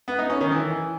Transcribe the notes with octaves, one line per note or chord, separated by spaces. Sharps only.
B3
D#4
C#4
D#3
E3